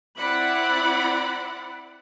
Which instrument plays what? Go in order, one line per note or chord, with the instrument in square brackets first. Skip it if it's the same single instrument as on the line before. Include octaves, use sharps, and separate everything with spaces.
[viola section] C4 E4 D5 F#5 B5